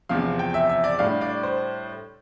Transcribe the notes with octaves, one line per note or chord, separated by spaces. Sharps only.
E2 C3 F3 F5
G5
E5
E5
D5
A2 G3 D4 F5
D5
C5